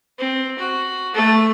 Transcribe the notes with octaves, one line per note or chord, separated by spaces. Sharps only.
C4
F#4
A3 A4